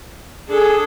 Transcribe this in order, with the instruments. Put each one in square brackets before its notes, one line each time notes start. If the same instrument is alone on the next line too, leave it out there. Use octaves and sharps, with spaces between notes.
[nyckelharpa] D4 A4 [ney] G#4